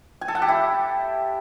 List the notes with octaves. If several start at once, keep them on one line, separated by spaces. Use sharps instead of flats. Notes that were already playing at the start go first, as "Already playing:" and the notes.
G#5
A4
F#5
G4
E4